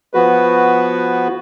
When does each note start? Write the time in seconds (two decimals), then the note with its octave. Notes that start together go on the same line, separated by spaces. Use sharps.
0.14 F3 B3 F#4 B4